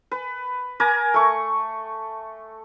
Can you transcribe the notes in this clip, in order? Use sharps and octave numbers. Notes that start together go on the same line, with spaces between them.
B4
A#4 G#5 A#5 D6
A3 C#6